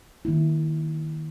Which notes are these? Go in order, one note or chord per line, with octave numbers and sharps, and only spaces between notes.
D#3 A#3 E4